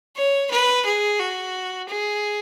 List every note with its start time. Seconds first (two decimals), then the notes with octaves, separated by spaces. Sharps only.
0.16 C#5
0.51 B4
0.85 G#4
1.19 F#4
1.88 G#4